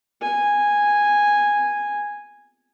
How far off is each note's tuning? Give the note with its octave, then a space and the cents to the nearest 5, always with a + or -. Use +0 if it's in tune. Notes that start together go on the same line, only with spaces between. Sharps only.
G#5 -10